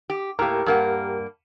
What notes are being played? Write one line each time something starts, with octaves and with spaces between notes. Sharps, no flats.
G4
A2 A#3 G4 A#4
G2 A#3 F#5